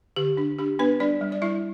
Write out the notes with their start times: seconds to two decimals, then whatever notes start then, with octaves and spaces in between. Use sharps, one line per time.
0.16 D3 G4
0.37 D4
0.59 D4 G4
0.79 B3 D4 B4
1.00 G3 D4 D5
1.21 G3
1.32 D5
1.42 G3 E4 E5